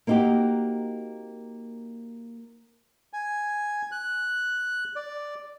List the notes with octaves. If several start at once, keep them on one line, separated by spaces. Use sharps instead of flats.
A#3 C4 D#4 F#4 G4
G#5
F#6
D5